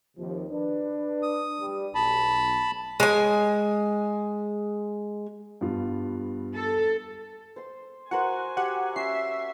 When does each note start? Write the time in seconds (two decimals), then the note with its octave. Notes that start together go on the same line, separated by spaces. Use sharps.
0.17 D#2 C3 F3
0.52 D4 B4
1.23 D#6
1.60 G3
1.95 B1 A5 B5
3.00 G#3 G#5
5.61 G2 B3 F4
6.55 A4
7.56 C5 C6
8.11 F#4 A#4 C5 F#5 G#5
8.57 F#4 G4 F#5 E6
8.96 C#4 F#4 E5 C7